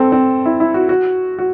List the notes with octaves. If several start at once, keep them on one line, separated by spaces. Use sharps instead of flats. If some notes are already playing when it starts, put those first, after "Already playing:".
Already playing: C4 A4
C4
E4
E4
F#4
F#4
F#4